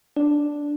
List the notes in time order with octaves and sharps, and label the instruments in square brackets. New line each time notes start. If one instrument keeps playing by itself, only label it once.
[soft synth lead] D4